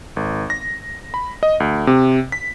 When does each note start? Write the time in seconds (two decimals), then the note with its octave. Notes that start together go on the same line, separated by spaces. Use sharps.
0.16 G#1
0.50 A#6
1.14 B5
1.43 D#5
1.60 D2
1.87 C3
2.32 B6